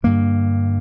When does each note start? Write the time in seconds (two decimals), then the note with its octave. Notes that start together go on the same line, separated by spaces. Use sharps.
0.03 G2 D3 A#3